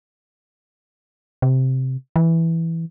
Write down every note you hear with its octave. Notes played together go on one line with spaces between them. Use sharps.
C3
E3